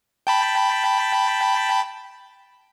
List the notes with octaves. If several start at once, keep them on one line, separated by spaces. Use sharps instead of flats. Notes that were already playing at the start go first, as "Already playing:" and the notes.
G5 A5 B5